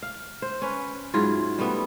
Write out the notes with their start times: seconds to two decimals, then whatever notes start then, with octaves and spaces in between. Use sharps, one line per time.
0.02 F5
0.42 C5
0.62 C#4 B4
1.14 G#2 F#3 E4 F4
1.58 G3 A3 B3